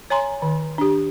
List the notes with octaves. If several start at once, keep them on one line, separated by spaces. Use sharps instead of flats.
C#5 G#5 A#5 C6
D#3
D4 G4